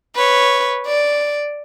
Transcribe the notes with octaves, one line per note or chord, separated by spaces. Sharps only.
B4 C#5
D5